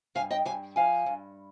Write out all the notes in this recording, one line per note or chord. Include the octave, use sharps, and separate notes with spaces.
G2 F5 G#5
D#5 G5
G2 F5 G#5
F3 F5 G#5
G2